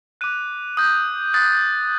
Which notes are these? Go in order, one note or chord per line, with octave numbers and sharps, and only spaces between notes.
D6 F#6 D#7
D#6 G6
D#6 F#6 A6